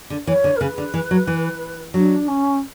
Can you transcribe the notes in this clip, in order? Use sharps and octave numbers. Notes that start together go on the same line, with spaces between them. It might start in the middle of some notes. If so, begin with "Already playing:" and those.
D3
E3 C#5
D3
A#4
C#3 B4
D3
E3
F#3
E3
F#3 D4
C#4